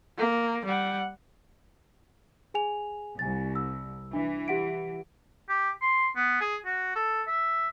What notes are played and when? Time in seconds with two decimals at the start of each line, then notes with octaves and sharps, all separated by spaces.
0.18 A#3
0.66 G3 F#5
2.54 G#4 G#5 F7
3.19 C2 G#5 A6
3.56 E6
4.13 E3 D4
4.48 G4 F#5 D7
5.49 G4
5.82 C6
6.16 B3
6.41 G#4
6.65 F#4
6.96 A4
7.27 E5